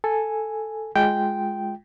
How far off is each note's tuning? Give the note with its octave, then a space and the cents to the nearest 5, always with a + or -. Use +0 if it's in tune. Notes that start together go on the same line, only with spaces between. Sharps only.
A4 +0 G#5 +0
G#3 +5 F4 +0 G5 -5